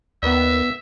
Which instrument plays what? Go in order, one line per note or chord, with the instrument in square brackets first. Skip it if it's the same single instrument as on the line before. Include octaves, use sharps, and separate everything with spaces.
[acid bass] D#2 [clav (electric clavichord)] B3 B4 D5 [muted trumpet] E5